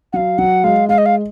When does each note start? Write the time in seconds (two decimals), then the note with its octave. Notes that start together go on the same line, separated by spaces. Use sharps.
0.13 F#3 F5 F#5
0.38 F#3 F#5
0.64 G#3 F5
0.89 G#3 F5
0.98 D#5
1.06 F5